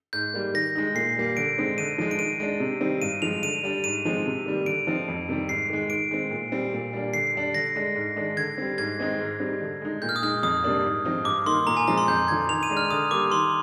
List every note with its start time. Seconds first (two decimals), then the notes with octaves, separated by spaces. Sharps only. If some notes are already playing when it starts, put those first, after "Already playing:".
0.13 G#2 G6
0.34 G3 A#3
0.54 D#3 A#6
0.75 G#3 D#4
0.95 A#2 C7
1.16 G3 A#3
1.37 D3 D7
1.58 G#3 C4 D#4
1.78 D3 D#7
1.98 F3 G#3 D#4
2.11 D7
2.19 D#3 D#7
2.40 G#3 D4
2.60 C3
2.81 D#3 G3 C4 D#4
3.02 G2 D#7
3.22 F3 G#3 F7
3.42 D3 D#7
3.63 G3 D4
3.84 G#2 D#7
4.05 F3 G#3 C4
4.26 C3
4.46 D#3 G3 A#3
4.66 D3 D7
4.87 F3 C4 D#4
5.08 F2
5.29 C3 D#3 G3
5.49 G#2 C7
5.70 D#3 G#3
5.90 D#3 D7
6.11 G#3 C4
6.31 A#2
6.52 G3 C4
6.73 A#2
6.93 G3 A#3 D4
7.14 D3 C7
7.34 G3 D4
7.54 D3 A#6
7.76 G#3 D4
7.95 G#2
8.16 D#3 G#3 D4
8.37 D3 G#6
8.58 G3 C4
8.78 G#2 G#6
8.99 D#3 G#3 C4 D#4
9.20 G#2
9.40 G3 C4 D#4
9.61 D3
9.81 G#3 D#4
10.02 A#2 G6
10.09 F6
10.16 D#6
10.23 G#3 D#4 F6
10.43 F2 D#6
10.64 C3 G3 A#3 D4
10.84 G#2
11.05 F3 C4 D#4
11.25 G2 D6
11.46 D#3 A#3 D#4 C6
11.67 A#2 A#5
11.77 G#5
11.87 F3 G#3 C4 A#5
11.98 C6
12.08 F2 G6
12.28 D3 F3 G#6
12.49 D#3 F7
12.63 D#7
12.70 G#3 D4
12.77 F6
12.90 D3 D#6
13.11 G3 A#3 D6
13.31 D#3 C6